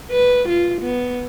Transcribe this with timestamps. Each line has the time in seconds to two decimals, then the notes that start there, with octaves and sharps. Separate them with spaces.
0.11 B4
0.49 F4
0.82 B3